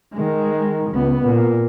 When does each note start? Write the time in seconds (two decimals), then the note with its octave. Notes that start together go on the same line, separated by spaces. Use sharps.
0.14 D#3 G#3
0.91 C#2 B3
1.24 A#2